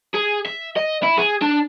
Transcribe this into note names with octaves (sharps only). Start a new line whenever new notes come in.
G#4
E5
D#5
E4
G#4
D4